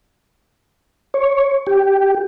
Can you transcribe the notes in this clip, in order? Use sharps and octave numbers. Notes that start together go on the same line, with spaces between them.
C#5
G4